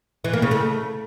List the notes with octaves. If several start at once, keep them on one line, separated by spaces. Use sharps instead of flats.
E3
A#3
C#3
A3